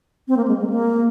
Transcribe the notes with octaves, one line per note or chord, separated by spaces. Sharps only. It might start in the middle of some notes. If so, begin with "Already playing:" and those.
C4
A#3
G#3
G#3
A#3